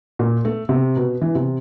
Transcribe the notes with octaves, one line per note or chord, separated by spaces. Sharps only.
A#2
A3
C3
B2
E3
C3